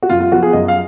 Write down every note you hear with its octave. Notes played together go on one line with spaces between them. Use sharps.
F#4
F#2 F4
F4
F3 B3 F#4
G#4
F#2 D#5
F5